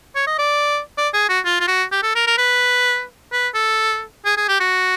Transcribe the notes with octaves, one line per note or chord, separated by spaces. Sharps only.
C#5
D#5
D5
D5
G#4
F#4
F4
F4
F#4
G4
A4
A#4
A#4
B4
B4
A4
G#4
G#4
G4
F#4